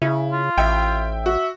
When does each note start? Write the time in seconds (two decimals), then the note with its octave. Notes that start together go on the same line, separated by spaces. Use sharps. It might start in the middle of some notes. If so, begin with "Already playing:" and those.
0.02 C#3 E4
0.32 F4
0.58 A1 E5 G5
1.26 F#4 E5